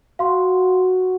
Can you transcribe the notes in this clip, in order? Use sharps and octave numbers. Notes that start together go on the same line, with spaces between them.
F#4 F5 C6